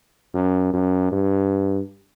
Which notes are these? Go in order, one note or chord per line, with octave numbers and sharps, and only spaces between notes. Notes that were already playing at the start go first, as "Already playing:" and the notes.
F#2
F#2
G2